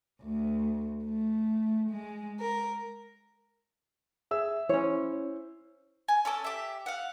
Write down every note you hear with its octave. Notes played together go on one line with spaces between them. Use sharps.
D2
A3
G#3
A#4
G#4 E5 E6
C#4 E4 C5 C#5
G#5
C#4 A4 D6 E6
G4 E5
F5 F#5